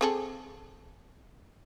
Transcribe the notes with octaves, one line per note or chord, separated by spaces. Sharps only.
C4 G#4 A4